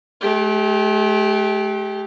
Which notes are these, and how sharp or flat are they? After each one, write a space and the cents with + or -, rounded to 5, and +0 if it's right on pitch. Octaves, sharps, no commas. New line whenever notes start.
A3 -45 G4 +0